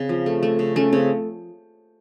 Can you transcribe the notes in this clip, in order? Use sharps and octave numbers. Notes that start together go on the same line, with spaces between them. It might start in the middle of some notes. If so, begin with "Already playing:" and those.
Already playing: C#3 C4
F3
A3
A3
C#3
A3 C#4
C#3 C4